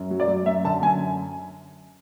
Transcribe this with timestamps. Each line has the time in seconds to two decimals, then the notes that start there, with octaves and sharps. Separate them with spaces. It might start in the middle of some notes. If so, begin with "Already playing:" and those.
Already playing: F#2
0.11 F#3
0.20 D5
0.28 F#3
0.46 F#2 E5
0.64 D3 A5
0.83 F#2 G#5